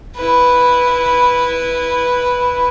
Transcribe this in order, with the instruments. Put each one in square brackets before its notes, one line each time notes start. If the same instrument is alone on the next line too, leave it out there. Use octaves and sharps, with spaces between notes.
[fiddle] E4 B4